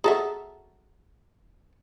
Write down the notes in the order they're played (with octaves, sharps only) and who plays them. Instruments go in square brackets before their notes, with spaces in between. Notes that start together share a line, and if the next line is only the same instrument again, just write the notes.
[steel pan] F#4 A5 A#5 [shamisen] G#4 A4 E5